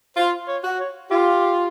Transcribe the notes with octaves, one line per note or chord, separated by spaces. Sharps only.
F4 C5
C#5
F#4
C#5
F4 G4